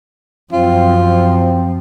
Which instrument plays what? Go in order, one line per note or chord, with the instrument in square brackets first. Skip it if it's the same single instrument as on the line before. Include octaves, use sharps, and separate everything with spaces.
[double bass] F#2 F3 [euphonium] C4 [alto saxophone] F4
[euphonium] C4